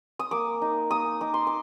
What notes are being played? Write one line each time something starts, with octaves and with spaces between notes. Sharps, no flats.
D#6
A#3 D6
D#4
A#3 D#6
D#4 D6
C6
D6